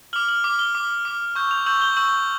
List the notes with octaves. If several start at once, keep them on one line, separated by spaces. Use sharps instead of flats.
D6 F6 F#7
F#7
D6 F6 F#7
G7
D6 F6
D6 F6
C#6 E6 G6
F7
C#6 E6 G6 F#7
G7
C#6 E6 G6 F#7